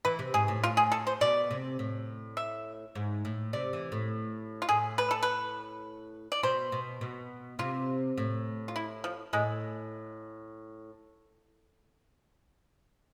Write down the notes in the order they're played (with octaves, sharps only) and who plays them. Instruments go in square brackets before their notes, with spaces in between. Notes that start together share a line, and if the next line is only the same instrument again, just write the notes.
[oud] E3 [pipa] B4
[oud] C3
[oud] G#2 [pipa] G#4
[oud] A2
[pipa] F4
G#4
A4
C5
[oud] B2 [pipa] D5
[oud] C3
A2
[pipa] E5
[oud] G#2
A2
[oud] C3 [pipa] D5
[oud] E3
A2
[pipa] F4
[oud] A2 [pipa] G#4
[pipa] B4
A4
B4
D5
[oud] B2 [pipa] C5
[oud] B2
B2
[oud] C3 [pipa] F4
[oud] A2
[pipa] F4
E4
F3
[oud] A2 [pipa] G#3